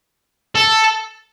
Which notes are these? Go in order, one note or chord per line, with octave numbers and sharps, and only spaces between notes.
A4